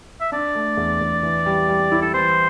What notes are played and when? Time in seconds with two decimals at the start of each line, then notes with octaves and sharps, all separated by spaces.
0.21 E5
0.32 D4 D5
0.55 A3
0.77 E2
1.01 E2
1.23 E3
1.46 G3
1.69 G3
1.92 E4
2.02 A4
2.14 E3 C5